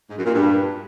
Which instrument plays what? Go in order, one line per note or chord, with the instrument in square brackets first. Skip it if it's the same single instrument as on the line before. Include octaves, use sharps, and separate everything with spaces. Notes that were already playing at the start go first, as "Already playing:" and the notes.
[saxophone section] G#2
F#2
A#2
G2